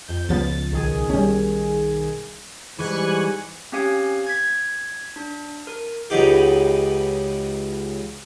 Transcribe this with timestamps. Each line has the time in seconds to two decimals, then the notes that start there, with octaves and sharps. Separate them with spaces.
0.08 F2 G6
0.29 C#2 F3 B3 A6
0.71 B1 D#3 G#4
1.10 G3 C#4
2.79 G#2 E3 G3 G#5 C#6 F#6
3.72 C4 C#4 G4 F5 G#5
4.27 G#6 B6
5.16 D4
5.67 A#4
6.10 C#2 F#3 B3 D#4 G4